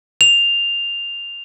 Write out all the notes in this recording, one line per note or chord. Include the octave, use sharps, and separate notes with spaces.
F7